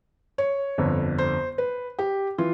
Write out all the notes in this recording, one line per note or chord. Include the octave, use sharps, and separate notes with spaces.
C#5
G1 F2 D3
C5
B4
G4
E3 F4